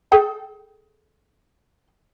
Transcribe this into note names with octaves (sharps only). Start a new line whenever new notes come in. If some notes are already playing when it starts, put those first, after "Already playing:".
G#4 A4 G5